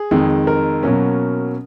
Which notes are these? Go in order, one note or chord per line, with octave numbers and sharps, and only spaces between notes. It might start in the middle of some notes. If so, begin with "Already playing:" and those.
Already playing: G#4
F2 D#3 G#3
A#4
B2 F#3 A#3 C#4